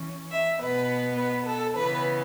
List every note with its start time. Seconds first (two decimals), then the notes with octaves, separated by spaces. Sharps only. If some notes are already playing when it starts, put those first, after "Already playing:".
Already playing: E3 C#4
0.31 E5
0.59 B2 B3 B4
1.17 B4
1.46 A4
1.75 C#3 E3 B3 B4